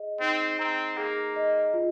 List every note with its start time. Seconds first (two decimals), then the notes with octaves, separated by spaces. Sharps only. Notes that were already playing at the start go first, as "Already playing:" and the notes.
Already playing: G#4 D#5
0.21 C4 D#4
0.59 C4 A#5
0.97 A#3 G#4
1.36 D#5
1.74 F4